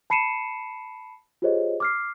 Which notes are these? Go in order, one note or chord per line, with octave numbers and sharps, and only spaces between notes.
A5 B5 C7 C#7 D#7 E7
F4 G4 G#4 C5 C#5 D#5
D6 F6 C7